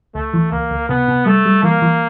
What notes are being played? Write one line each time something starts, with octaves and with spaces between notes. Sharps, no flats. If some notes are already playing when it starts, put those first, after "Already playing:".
C#2 A3
E3
C#2 A#3
C#2
C3 B3
C3
G3 A3
G3
E3 A#3
E3